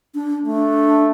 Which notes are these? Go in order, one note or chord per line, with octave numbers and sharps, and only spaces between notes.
D4
A3 D4